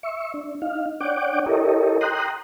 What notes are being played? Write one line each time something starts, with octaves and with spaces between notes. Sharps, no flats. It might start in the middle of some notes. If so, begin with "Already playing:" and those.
E5 C#6
D4
D#4 F5
D4 C#5 D5 F#5 G5 D6
E4 G4 A4 A#4 C#5 D#5
G5 A#5 C6 D#6 F#6